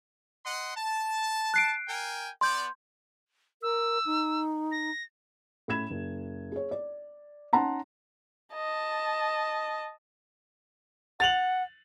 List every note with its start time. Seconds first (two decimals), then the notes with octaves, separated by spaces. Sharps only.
0.45 D#5 F#5 C6
0.76 A5
1.54 F#6 C7 D7
1.87 A#4 G5 G#5
2.41 B3 D5 C6 G6
3.63 A#4 E6
4.06 D#4
4.72 A#6
5.68 A2 C#4 B5 G#6 E7
5.91 F#1
6.52 G#4 C#5
6.71 D5
7.53 C#4 D#4 F#5 A5 A#5 C6
8.53 D#5 A5
11.20 F#5 A6 F7 F#7